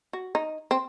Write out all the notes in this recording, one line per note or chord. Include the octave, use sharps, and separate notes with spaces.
F#4
D#4
C4